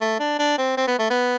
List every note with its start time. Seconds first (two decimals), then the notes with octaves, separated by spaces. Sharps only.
0.01 A3
0.20 D4
0.39 D4
0.58 C4
0.77 C4
0.87 B3
0.99 A3
1.10 B3